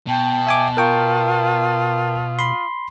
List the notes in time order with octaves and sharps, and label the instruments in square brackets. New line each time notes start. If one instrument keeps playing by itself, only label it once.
[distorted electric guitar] B2 [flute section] G5 [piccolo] A5
[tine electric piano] E5 G#5 D6
[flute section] F4 D#6 [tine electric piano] A#4 G5 C#6
[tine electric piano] B5 C6